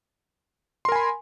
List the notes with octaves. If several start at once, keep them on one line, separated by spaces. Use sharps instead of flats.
A#4 G#5 B5 C6